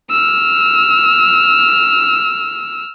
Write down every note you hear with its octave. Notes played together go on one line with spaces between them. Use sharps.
E6 F6